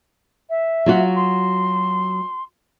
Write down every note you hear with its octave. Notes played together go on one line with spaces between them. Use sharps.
E5
F#3 F4 F#4
C6